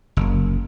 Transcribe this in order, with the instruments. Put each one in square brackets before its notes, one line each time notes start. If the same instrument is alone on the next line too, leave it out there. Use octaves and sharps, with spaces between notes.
[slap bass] F#1